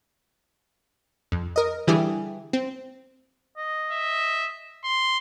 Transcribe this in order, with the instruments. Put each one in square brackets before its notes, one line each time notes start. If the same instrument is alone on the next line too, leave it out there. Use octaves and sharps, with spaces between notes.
[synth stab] F2
A#4 D#5
D3 E3 G3 E4 G4 G#4
C4
[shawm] D#5
[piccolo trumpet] E5
C6